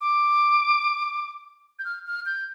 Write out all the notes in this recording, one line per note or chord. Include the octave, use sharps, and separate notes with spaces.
D6
G6
F6
F6
G6